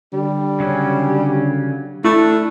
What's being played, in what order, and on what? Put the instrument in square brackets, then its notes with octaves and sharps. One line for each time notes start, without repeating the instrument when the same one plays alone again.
[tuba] D3 [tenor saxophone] G3
[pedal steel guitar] C#3 F#3 C#4
[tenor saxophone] A3 [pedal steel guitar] D4 [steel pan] E4